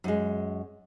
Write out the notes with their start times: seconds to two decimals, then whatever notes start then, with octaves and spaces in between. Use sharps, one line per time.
0.04 F#2 G#3